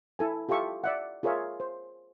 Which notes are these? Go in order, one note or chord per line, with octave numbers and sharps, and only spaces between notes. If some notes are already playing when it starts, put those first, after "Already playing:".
E4 A4 G#5
F4 G4 A4 E5 C#6
D5 E5 F#5
F4 G#4 A#4 C#5 E5
C5